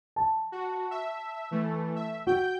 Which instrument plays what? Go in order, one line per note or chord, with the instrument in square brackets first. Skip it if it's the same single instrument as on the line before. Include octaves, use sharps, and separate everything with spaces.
[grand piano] A5
[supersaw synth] F#4
E5
E3 A3
E5
[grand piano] F#4 [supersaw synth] G5 G6